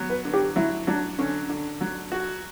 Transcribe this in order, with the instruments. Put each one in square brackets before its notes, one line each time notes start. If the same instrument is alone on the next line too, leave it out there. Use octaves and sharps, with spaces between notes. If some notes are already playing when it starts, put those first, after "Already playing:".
Already playing: [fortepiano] F#3 B3
[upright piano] B4
[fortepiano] D3
[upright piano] G4
[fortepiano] F#3 [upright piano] E4
[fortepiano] F#3 [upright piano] D4
[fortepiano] D3 [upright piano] C#4
[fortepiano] D3
F#3
F#4